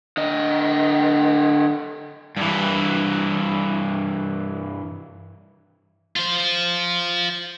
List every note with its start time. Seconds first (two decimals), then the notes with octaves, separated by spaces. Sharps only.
0.17 D3 D#5
2.36 G2 E3
6.16 F4 C5